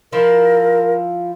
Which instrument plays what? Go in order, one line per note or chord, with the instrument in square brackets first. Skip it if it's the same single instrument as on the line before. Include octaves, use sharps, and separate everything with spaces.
[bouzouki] F3 E4 F4 [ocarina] A#4